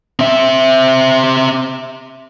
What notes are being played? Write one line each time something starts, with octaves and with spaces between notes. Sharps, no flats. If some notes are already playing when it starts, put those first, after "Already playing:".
C4 E5